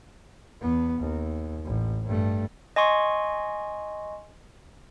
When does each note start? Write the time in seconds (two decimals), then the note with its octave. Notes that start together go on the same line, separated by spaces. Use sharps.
0.61 E2 B3
1.00 D#2
1.66 A1
2.07 G2 A3
2.76 D#5 G#5 C6 C#6